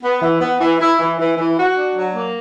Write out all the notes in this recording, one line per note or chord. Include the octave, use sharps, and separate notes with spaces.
B3
E3
B3
E3
E4
E3
E3
E3
F#4
D4
F#3
A#3